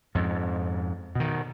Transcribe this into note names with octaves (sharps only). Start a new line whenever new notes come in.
F2 G#2
B2 D#3